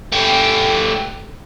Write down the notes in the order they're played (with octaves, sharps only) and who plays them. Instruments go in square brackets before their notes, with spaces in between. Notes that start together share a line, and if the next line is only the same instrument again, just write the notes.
[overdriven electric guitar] A3 G4